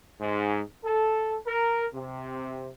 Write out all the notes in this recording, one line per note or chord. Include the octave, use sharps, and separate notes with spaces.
G#2
A4
A#4
C3